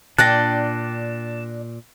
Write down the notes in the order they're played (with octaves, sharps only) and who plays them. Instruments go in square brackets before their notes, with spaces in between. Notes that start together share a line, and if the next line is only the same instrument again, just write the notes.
[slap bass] A#2 [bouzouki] D4 D5 G5 [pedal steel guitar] A5 [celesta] F#6 A#6